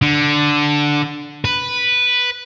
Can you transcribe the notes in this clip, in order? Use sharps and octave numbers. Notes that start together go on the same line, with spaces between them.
D3
B4